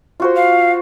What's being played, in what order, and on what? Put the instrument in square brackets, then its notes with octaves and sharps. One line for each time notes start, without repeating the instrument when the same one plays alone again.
[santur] F4 F#4 C5
[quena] F5